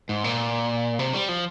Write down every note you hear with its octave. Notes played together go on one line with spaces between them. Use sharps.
G#2
A#2
C3
G3
F3